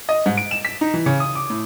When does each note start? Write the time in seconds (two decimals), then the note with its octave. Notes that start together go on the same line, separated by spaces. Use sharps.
0.09 D#5
0.26 G#2
0.37 D7
0.51 E7
0.65 B6
0.81 D#4
0.94 E3
1.06 C#3
1.20 D#6
1.35 D6
1.50 A2